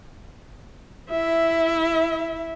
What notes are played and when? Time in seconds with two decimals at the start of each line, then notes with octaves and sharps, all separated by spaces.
1.11 E4 E5